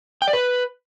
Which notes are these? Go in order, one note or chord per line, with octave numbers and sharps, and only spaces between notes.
G5
D5
B4